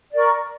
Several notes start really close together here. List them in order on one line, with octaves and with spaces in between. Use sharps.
D5 A#4 C#6